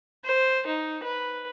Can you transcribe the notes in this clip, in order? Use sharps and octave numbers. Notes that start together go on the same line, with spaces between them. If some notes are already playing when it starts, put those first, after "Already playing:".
C5
D#4
B4